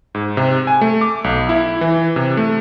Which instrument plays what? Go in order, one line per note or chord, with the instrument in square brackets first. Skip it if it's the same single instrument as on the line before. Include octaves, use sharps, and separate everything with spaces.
[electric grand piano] G#2
C3
G#5
A3
D6
B1
E4
E3
C3
A3